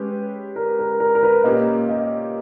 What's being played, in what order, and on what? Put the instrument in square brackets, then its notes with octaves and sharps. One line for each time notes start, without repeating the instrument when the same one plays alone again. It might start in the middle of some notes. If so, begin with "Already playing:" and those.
Already playing: [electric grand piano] G#3 C#4 G4 [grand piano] B4
[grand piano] A#4
A#4
A#4
A#4
B4
[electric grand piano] A#2 A#3 C#4 G4 [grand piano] D#5
[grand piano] D#5